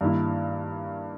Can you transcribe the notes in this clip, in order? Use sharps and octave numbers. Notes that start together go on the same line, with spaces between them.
G2 D#3 A#3 E4